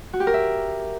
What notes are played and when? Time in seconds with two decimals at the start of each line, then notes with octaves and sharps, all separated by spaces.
0.13 F#4
0.20 G4
0.27 A#4
0.34 E5